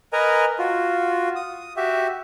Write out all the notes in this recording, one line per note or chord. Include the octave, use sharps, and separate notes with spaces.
A#4 B4 D#5 G#5 A#5
F4 F#4
D#6
F#4 G4 E5